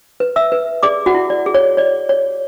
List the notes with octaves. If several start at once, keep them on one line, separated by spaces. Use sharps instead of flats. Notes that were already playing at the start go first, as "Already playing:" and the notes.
B4
E5 E6
B4
G#4 D5 D6
F#4 F#5
E4
D5
G#4
C#5
C#5 D5
C#5